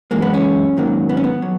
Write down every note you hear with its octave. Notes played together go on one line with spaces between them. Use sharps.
F#2 E3 G#3 A#3
B3
C#4
G#2 D#3 F#3 A#3
B3
C#4
B3
F#3